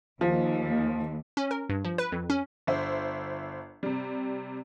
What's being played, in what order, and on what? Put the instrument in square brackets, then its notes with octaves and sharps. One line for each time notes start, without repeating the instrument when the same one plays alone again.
[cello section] D#2 [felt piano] F3
[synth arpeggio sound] C#4
A#4
G2
F3
B4
F2
C#4
[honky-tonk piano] G1 C5 E5
C3 G3